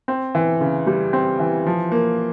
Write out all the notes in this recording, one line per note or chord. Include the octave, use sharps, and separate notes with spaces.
C4
E3
C#3
G3
C4
E3
F3
A#3